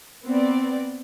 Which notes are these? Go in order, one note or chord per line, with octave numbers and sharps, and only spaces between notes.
B3 C4 D5